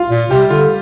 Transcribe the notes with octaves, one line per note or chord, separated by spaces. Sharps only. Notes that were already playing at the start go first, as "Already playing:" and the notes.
Already playing: F4 F5
A#2
C3 G3 G4
D3 F4